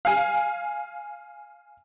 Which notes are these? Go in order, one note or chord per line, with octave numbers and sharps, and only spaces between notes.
F5 G#5